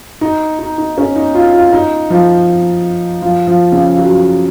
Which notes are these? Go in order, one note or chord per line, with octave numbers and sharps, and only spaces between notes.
D#4
D#4
D#4
C#4
D#4
F4
F4
D#4
F3
F3
F3
C#3
F#3